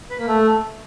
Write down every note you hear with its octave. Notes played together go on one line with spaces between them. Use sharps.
B4
A#3
A3